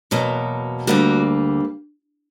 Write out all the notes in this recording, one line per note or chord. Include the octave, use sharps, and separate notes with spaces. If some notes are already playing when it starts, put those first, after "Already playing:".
E2 B2 F#3 A#3
D2 D3 G3 A#3 F#4